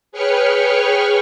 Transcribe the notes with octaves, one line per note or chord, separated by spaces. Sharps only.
G#4 B4 C#5 G5 C#6 F6